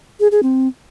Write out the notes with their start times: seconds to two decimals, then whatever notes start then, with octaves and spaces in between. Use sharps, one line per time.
0.20 G#4
0.32 G#4
0.43 C4